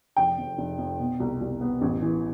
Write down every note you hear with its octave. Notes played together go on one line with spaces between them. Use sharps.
F1 G5
F2
F1
F2
B2
C2
C2
B3
A1
E3